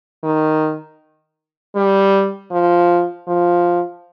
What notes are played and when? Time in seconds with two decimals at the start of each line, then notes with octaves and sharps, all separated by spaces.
0.24 D#3
1.76 G3
2.51 F3
3.27 F3